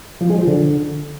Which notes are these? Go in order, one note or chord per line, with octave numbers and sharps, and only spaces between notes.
F3
G#3
F3
D3